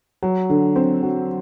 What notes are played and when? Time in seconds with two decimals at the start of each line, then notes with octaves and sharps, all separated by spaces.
0.23 F#3
0.50 D3
0.76 C4
1.03 F#3